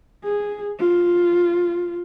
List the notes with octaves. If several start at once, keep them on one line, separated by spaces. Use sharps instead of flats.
G#4
F4